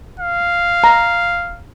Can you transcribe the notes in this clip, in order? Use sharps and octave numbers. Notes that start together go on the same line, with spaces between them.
F5
A#5